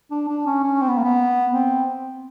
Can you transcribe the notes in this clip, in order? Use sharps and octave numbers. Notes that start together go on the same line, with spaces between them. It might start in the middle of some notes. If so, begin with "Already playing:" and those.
D4
D4
C#4
C#4
C4
B3
A#3
B3
C4